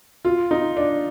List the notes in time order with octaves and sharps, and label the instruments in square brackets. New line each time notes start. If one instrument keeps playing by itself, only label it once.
[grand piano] F4
D#4
D4